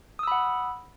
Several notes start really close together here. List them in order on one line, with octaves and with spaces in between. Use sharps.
D#6 E6 B5 F#5